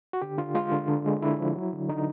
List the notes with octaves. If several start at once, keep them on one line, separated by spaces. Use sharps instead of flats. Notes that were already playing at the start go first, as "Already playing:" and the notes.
F#4
D3 G4
D3 F4
G#3 F4
D3
D3
G#3
D3 E4
F3
F#3
D3
D3 D#4